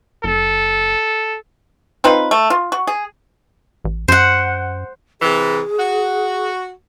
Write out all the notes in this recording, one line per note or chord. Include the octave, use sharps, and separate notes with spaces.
F#1 A4
C4 D#4 F4 B4
A3
F4
F#4
G#4
A1
F#2 C5 F#5
C3 E3 G#4
F#4